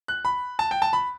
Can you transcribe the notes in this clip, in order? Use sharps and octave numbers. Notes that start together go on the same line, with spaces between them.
F#6
B5
A5
G5
A5
B5